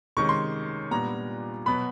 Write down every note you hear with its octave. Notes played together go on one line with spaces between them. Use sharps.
C3 D#3 G#3 C#4 C#6
C6
A#2 G3 B3 D4 A#5
B2 F#3 B3 B5